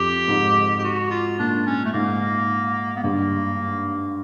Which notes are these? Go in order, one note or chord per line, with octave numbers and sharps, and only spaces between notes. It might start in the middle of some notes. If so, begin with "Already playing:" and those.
Already playing: F2 G4
G#2
G4
F#4
F4
A#2 D4
C#4
A3
G#2 A#3
B3
G2 A#3